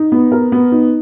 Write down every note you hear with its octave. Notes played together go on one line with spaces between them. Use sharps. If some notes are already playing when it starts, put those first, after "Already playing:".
Already playing: D#4
B3
A#4
B3
D#4